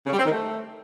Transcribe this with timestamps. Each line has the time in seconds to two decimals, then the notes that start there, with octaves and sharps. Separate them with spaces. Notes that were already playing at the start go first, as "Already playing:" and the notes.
0.07 C#3
0.13 G3
0.19 C4
0.26 D#3
0.32 A3